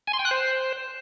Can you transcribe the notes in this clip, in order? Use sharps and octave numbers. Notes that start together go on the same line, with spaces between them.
G#5
C6
G5
F#6
C5